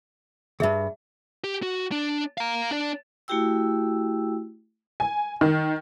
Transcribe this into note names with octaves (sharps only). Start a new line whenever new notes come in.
D2 G2 G#4 E5
G4
F#4
D4
F5 A#5
D4 D5
A3 E4 F#4 G4 G5 E6
G#5
D#3